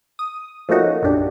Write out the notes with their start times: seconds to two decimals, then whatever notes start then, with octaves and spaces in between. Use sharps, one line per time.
0.19 D#6
0.69 F3 A3 A#3 C#4 D#4 F#4
1.02 A#1 F#2 A#2 D4 G4